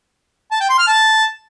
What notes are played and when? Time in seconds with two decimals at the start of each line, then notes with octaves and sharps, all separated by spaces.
0.51 A5
0.60 G5
0.69 C6
0.78 F6
0.87 A5